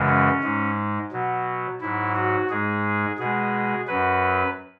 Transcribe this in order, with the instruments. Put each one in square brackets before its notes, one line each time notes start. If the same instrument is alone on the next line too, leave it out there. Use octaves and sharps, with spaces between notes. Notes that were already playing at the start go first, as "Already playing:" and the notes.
Already playing: [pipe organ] F#2 C#3 E3 G#3
C#4
G#2 G#3
B2 F#3
G#2 F#3 E4
F#4
G#2 G#3 G#4
B2 G#3 G#4
F#2 F#3 B4